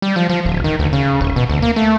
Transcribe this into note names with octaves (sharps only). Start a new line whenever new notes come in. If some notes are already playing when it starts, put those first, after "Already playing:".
G3
F3
F3
D1
D#3
D2
C#3
D#1
B2
D2
A#3
A3